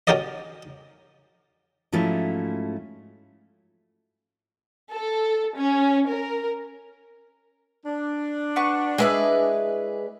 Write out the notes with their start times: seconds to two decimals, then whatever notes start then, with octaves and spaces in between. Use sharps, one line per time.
0.07 C#4 F#4 G4 A#4 D5 D#5
1.92 G#2 F3 F#3 A3 C#4 E4
4.90 A4
5.56 C#4
6.10 A#4
7.86 D4
8.56 F#4 B4 C#6
8.98 G#3 E4 G#4 B4 D5 G#5